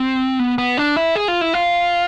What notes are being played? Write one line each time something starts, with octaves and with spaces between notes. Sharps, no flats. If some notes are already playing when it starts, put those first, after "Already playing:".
Already playing: C4
B3
B3
D4
E4
G#4
F4
E4
F4